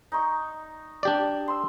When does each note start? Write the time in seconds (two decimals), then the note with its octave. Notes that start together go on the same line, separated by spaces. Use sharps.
0.12 D#4 C#6
1.03 D4 G4 D5
1.48 C6 E6